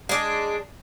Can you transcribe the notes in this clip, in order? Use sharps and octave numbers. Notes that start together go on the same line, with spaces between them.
G#3 D4